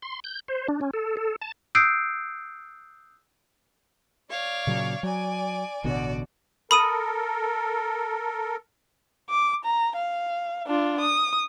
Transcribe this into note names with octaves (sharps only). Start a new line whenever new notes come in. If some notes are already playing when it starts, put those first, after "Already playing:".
C6
G6
C5
D4
C#4
A4
A4
A5
D#6 E6 F#6 G6 C7 D7
C#5 D5 F5
A#2 C#3 F#3
F#3 D5 G#5
A1 B2 D3 F#4 D5
A4 A#4 B5 D#6 D#7
D6
A#5
F5
D4 F4
D#6